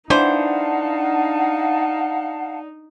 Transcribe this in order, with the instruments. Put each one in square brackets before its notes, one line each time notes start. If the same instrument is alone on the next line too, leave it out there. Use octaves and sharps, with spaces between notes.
[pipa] E3 C5 [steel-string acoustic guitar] D4 [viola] D#4 [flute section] F5 F#5 A5